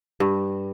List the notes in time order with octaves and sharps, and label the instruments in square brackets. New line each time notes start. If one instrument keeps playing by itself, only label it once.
[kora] G2